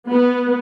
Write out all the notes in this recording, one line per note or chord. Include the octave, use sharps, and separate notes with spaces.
B3